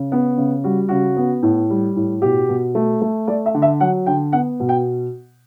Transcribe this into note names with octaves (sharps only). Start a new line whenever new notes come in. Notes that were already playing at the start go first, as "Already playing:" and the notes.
Already playing: C#3
B3
C#3
G3 F#4
C#3 F#4
B3
A2
G3
A2
B2 G4
B2
A3
A3
A3 D5
E5
D3
E5
F#3 F#5
D3 G5
B3 F#5
B2
G5